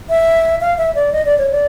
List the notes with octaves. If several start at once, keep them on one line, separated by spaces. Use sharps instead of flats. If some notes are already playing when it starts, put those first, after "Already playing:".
E5
F5
E5
D5
D#5
D5
C#5
D5